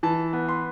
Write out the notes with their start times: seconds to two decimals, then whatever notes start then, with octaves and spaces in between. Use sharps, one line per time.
0.03 E3 A5
0.33 B3
0.49 C6